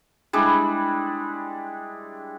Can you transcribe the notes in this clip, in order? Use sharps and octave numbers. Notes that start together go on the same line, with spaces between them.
G3 G#3 D4 E4